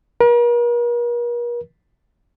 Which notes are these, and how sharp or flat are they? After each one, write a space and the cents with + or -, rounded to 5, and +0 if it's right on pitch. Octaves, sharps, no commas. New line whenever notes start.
A#4 +45